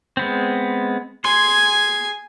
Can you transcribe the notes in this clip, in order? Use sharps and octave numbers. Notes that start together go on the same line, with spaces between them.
G#3 B3 C4
G#4 G#5 C6